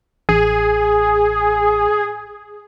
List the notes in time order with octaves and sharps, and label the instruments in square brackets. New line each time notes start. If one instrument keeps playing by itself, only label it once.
[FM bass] A1 [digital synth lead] G#4